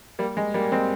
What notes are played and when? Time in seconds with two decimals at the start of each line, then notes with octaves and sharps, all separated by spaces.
0.19 G3 A#3
0.37 G#3
0.54 G3 A#3
0.72 G#3 C4